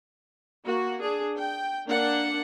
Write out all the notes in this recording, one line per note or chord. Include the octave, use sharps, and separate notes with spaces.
A#3 F#4
D4 G#4
G5
A#3 D4 F#5